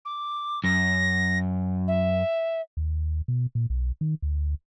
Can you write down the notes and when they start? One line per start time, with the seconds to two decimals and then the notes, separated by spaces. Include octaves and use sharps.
0.05 D6
0.64 F#2 A#6
1.88 E5
2.77 D#2
3.28 B2
3.55 A#2
3.70 B1
4.01 D#3
4.22 D2